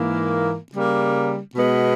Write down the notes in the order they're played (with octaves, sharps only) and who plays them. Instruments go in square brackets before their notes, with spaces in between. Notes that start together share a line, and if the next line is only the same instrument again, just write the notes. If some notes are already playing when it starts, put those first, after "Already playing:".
Already playing: [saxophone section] G#2 E3 A#3
C#3 G3 A#3
B2 G#3 B3